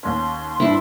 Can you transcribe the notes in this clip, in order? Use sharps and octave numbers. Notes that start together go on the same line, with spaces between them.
D#2 C#4 C6
G#1 G2 D4 E4